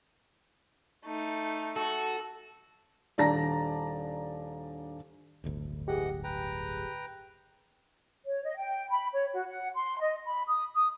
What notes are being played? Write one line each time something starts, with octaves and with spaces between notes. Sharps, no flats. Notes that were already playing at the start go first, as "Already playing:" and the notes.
A3 D#4
F#4 A4
D#1 D4 D5 A5 A#5 A#6
D1 G1 D2
E3 G4 G#4 D#5 F#5
B4 G5 A#5
C#5
D#5
G5
B5
C#5
F#4
F#5
C6
D#5
B5
D#6
D#6